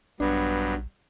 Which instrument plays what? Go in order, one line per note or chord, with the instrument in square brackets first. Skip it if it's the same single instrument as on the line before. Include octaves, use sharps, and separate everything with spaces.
[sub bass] A#1 [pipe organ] G2 F#3 [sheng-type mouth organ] B3 [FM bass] D4